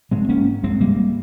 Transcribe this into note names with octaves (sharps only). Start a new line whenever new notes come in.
G#2 G#3 C4
A#3 C#4
G#3 C4
G3 A#3